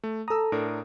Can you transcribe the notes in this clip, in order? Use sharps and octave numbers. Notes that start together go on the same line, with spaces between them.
A3
A4 A#5 D#6 E6
A2 D4 A#4